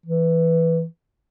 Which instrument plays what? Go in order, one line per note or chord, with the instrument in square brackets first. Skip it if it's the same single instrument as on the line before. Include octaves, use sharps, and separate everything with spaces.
[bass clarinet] E3